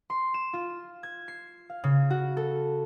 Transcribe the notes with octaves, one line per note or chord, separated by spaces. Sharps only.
C6
E7
F4
G#6
C7
F5
C#3
F#4
A4